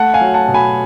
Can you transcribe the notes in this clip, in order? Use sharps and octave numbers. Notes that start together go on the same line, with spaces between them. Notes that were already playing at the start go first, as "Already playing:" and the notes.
Already playing: A3 F#5 A5
F5 G#5
F#3
F#5 A5
B2
G#5 B5